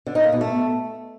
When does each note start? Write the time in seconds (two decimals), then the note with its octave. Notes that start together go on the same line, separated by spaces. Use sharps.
0.07 D3
0.15 D#4
0.24 A#3
0.32 B2
0.41 A3